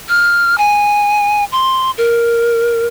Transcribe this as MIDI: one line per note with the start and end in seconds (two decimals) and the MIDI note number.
0.09 0.58 89
0.58 1.44 80
1.52 1.91 84
1.98 2.87 70